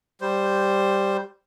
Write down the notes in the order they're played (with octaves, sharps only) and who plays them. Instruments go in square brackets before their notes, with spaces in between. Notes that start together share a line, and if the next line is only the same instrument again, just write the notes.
[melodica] G3 C5